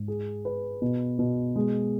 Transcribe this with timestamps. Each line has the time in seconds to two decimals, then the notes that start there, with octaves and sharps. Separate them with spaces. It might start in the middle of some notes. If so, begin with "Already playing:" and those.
Already playing: G#2
0.08 G#4
0.45 B4
0.82 B2
1.19 B2
1.56 G#3